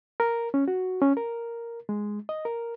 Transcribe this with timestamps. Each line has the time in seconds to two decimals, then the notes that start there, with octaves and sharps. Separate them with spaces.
0.20 A#4
0.54 C#4
0.68 F#4
1.01 C#4
1.17 A#4
1.89 G#3
2.29 D#5
2.45 A#4